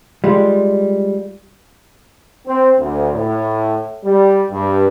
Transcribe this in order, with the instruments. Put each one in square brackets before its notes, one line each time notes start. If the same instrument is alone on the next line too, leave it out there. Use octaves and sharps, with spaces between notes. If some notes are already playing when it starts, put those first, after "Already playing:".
[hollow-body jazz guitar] G3 G#3 F4
[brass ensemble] C4
D2
A2
G3
G2